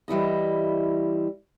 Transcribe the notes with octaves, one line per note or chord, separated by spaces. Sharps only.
E3 G3 E4 D#5